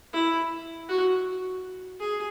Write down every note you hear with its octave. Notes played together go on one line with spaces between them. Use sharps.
E4
F#4
G#4